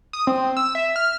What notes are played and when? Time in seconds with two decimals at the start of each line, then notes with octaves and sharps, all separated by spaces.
0.13 D#6
0.27 C4
0.57 E6
0.75 E5
0.96 F6